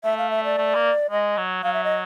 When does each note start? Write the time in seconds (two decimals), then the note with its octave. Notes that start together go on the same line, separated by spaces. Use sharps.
0.04 A3 E5
0.17 F5
0.30 E5
0.44 D5
0.57 A3
0.75 A#3
1.11 G#3 D#5
1.37 F#3
1.64 F#3 F5
1.74 E5
1.84 D#5